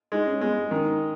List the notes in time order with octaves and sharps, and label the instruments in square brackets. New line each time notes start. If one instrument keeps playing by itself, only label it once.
[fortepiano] G#3 [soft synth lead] D#4
[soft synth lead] C#4
[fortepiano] G#3 [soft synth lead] B3
[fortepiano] D#3 [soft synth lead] C#4
[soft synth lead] D#4